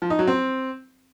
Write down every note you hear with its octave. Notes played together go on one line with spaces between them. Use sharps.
F3
D#4
F#3
C4